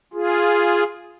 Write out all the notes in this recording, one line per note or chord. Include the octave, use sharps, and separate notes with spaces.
F4 G#4